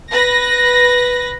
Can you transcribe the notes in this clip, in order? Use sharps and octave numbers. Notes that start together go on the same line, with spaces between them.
B4 A#6